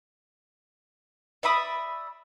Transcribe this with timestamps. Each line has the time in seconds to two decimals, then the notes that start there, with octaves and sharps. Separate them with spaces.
1.43 D5 E5 B5 D#6